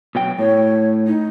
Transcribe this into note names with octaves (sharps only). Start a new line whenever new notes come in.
B2 F#3 G5
A2 C#5
D#4